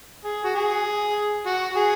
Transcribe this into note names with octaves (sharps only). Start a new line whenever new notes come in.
G#4
F#4
G#4
F#4
G#4